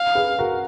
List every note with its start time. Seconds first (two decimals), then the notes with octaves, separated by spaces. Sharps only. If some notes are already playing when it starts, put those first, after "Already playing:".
Already playing: F5
0.15 G#4 B4
0.39 F#4 A#4